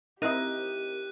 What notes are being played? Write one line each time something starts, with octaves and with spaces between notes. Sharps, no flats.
C4 D#4 E4 G4 A#4 D#5 F#6 D#7